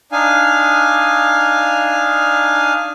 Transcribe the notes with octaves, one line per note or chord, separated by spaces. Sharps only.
D4 D#4 F5 G#5